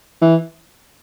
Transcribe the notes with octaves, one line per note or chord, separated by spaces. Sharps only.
E3